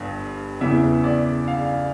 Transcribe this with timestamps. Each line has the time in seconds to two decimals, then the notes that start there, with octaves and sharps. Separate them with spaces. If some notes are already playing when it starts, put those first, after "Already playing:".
Already playing: G1 G2
0.61 E2 C#3 E3 E5
1.04 D5
1.48 F5